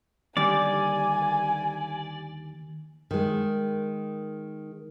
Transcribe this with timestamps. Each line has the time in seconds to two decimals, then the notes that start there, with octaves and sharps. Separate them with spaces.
0.37 D#2 D3 G3 D5 G#5
3.11 D#3 G#3